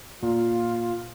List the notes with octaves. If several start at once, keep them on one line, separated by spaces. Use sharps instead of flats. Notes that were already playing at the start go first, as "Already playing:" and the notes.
A#2 F4